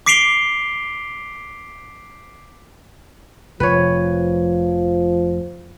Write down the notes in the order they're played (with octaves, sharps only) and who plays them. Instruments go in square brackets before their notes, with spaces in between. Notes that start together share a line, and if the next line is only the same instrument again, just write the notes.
[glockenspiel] D6 B6 C7 D7 F7 G7
[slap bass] F1 [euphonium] F3 [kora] B4 C#5